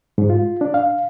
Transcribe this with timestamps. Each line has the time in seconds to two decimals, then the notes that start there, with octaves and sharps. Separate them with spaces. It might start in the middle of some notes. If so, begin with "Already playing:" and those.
0.18 G#2
0.30 F4
0.61 D4
0.74 F5